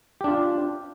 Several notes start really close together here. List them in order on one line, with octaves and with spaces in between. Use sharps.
G4 D4 F4